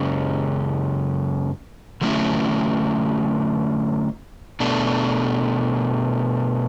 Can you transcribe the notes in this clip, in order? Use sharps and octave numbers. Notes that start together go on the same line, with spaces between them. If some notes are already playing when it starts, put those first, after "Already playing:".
Already playing: F#2 C#3 G#3 C#4
D3 F#3 A3 C#4 E4
B2 A3 D4